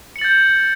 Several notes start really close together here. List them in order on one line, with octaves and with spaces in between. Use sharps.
C#7 F#7 A6 G6